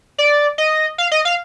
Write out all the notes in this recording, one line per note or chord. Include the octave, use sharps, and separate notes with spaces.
D5
D#5
F5
D#5
F5